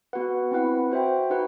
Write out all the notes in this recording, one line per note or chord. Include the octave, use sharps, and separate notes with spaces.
B3 F#4 B4 F#5
C4 E4 B4 F#5
F#4 C5 E5 G5
D#4 F#4 B4 F#5